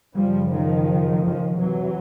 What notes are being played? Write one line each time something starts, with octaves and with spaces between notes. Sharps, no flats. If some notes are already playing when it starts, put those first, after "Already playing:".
F#2 C#3 F3 G3
D#3 F3
D#3 F3
F2 C3 E3 F#3